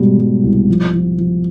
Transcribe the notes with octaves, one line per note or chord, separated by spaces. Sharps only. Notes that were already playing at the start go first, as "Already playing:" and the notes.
Already playing: G#2 B2 G3
G3
C2
F3
F3
F3